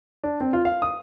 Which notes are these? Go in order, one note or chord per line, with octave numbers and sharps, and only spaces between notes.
D4
C4
F4
F5
D#6